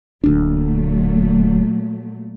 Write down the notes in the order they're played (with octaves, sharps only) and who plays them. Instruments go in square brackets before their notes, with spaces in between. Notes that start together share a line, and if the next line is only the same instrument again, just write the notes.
[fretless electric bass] D1 D2 D4 [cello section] A#2 F#3 A3